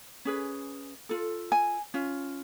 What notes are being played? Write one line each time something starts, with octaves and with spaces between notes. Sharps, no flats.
C#4 G#4 B4
F4 A4
G#5
C#4 F4